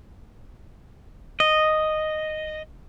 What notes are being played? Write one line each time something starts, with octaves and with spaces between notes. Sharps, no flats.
D#5